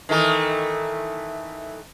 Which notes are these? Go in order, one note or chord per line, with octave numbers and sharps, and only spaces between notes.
D#3 E3 A3